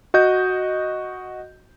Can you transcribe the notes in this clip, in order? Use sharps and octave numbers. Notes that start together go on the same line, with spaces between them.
F#4 D#5 G6